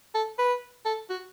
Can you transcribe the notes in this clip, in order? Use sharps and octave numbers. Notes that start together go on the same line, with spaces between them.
A4
B4
A4
F#4